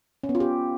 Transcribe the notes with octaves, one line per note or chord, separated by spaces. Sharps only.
C#4
B3
F4
G4